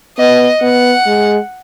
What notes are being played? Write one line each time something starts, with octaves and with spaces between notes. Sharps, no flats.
B3 D#5
B3 F#5
G#3